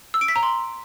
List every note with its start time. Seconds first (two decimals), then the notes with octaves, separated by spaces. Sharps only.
0.14 E6
0.21 D7
0.28 B6
0.36 A#5
0.43 C6